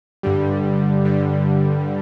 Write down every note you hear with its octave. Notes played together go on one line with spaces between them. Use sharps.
G2 D3 G3
G2 D3 G3